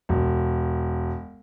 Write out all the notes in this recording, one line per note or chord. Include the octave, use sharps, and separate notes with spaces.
E1